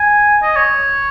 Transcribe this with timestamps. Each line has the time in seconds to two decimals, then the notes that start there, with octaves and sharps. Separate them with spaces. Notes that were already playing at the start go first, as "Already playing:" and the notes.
Already playing: G#5
0.43 D#5
0.56 C#5